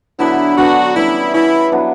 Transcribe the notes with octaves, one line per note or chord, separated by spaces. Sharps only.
D3 F#3 B3 D4 E4
D3 F#3 B3 D4 F#4
E3 G3 C#4 E4
E3 G3 C#4 E4
F#3 B3 D4